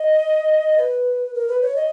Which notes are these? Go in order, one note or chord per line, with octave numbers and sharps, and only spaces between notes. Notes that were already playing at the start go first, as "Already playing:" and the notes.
Already playing: D#5
B4
A#4
B4
C#5
D#5